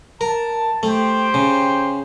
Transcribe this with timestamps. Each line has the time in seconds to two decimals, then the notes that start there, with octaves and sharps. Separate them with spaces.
0.21 A#4 A5
0.83 A3 G4 C5 G5
1.34 C#3